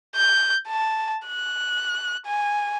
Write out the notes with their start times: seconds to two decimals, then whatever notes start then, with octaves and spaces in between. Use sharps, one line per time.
0.16 G6
0.68 A5
1.27 F#6
2.26 G#5